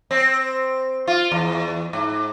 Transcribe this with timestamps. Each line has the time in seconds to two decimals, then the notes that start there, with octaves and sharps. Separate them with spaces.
0.11 C4
1.08 F4
1.32 E2
1.93 G#2